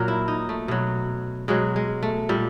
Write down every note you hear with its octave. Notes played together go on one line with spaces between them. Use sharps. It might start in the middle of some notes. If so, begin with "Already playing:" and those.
Already playing: A#2 F#3 A#4
E4
D#4
A3
B2 F#3
B2 F#3 G#3
G#3
A3
A#2 G3